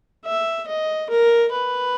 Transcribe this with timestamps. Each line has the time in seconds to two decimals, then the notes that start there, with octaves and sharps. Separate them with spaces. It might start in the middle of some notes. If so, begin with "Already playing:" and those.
0.26 E5
0.68 D#5
1.10 A#4
1.52 B4